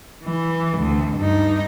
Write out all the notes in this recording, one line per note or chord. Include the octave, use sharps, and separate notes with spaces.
E3
D2
G2 D#4